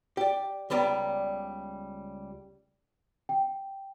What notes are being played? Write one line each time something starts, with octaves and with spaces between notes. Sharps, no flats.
G4 D5
C#2 G3 B3 D5 A#5
G5